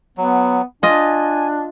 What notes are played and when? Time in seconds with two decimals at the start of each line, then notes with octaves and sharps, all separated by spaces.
0.17 F#3 B3
0.83 D4 F4 D#5 G#5